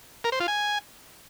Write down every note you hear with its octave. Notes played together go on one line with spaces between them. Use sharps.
A#4
C5
F4
G#5